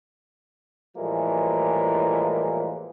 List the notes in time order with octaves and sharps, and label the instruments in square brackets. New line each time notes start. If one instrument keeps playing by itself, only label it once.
[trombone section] A2 E3 F3 G3 G#3 A#3